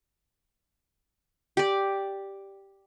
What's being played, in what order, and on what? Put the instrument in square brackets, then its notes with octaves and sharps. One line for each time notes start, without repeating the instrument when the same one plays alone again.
[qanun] G4 D5